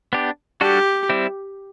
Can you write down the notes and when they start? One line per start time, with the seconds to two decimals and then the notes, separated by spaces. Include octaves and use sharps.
0.13 B3 D4 G4
0.61 G3 D4 F#4 G4 A4
1.09 G3 C4 E4